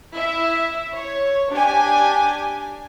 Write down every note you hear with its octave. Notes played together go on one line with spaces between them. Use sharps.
E4 E5
C#5
D4 G4 G#5